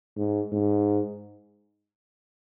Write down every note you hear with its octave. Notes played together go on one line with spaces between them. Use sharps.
G#2
G#2